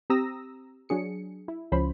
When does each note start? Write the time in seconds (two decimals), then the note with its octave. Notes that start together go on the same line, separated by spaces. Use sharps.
0.10 C4 G4 A#5 D#6 E6 A#6
0.89 F#3 D4 G#4 C#7
1.48 E4
1.72 C#2 F3 C#4 C5 B5